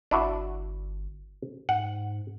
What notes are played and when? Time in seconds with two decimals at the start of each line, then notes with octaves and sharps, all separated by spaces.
0.11 G1 D4 E4 F#4
1.69 G#2 F#5